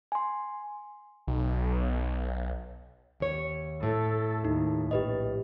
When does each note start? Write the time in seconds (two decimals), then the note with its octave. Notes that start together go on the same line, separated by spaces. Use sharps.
0.12 G#5 C6
1.27 B1
3.20 D#2 C#5
3.83 A2 A4
4.45 D#2 D#4
4.91 A#1 G4 B4 D#5